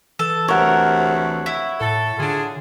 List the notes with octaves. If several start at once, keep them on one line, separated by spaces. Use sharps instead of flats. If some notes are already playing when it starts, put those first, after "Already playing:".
E3 A4
D2 C3 A#4 C#5 F#5
E4
A2 A4
D3 D4 F4 G#4